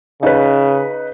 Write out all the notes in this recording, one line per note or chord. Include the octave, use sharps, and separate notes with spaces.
C#3 D#4 B4